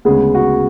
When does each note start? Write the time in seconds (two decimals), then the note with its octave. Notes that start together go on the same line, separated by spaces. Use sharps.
0.05 D2 C#3 G#3 B3 G#4
0.35 F#4